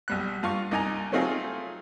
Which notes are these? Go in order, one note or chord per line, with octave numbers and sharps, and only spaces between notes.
B1 G3 F#6
G2 F4 C#6
C2 D#4 G#5 A#5
F#3 A3 C4 D#4 F4 G#4